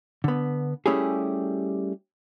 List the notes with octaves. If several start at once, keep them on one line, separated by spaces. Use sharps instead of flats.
D3 B3
G3 A3 C#4 E4 G4 G#4